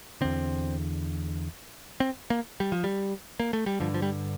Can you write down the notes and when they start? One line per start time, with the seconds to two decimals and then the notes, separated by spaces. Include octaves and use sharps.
0.21 E2 D3 C4
2.00 C4
2.30 A#3
2.60 G3
2.72 F3
2.84 G3
3.40 A#3
3.53 A3
3.66 G3
3.80 G2 D3 F3
3.94 F3
4.02 G3